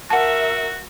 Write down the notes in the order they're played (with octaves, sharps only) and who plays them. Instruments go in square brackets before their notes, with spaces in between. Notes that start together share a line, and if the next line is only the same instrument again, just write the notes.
[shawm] F#4 [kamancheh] A#4 E5 [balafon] F#5 A5